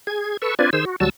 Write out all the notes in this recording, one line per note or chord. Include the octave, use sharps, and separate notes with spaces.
G#4 G#6
A4 B4 C#6 E6
C4 D4 F4 B4 D5 G#5
D#3 G#4 C5 E6
F#4
D2 F#3 G3 F#4 A5 E6